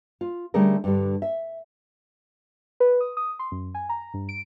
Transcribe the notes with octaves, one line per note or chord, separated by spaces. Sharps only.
F4
D3 G3 A3 C#4 G#4 A#4
G2 D3 G3
E5
B4
D#6
D#6
C6
F#2
G#5
A#5
G2
D7